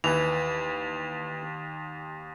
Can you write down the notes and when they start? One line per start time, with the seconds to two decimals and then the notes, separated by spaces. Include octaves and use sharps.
0.04 D#2 E3 F7